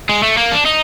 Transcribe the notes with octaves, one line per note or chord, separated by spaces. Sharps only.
G#3
A3
A#3
D4
D#4